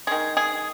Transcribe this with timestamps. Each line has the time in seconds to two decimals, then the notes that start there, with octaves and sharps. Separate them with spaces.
0.07 D#3 G#3 G#4
0.37 G#4